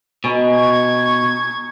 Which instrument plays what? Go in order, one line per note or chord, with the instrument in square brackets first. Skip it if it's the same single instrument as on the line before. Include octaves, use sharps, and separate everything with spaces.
[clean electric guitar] B2 [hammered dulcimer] D#4 G#5
[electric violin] C#6 G#6